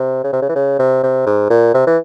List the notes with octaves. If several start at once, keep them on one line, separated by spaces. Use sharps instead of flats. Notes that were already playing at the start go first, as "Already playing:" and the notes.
Already playing: C3
C#3
C3
C#3
E3
C#3
C3
C3
G#2
A#2
C3
E3